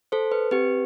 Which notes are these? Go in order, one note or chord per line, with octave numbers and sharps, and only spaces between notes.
A4 C5
B4
C4 G4 B4